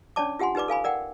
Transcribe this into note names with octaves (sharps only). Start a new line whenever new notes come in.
C#4 D4 C#5 D5 A5 D6
F4 G4 F#5 G#5 C6
D#4 G4 B4 D5 D6
A4 F5 G#5 B5
A#4 D5 F#5 G5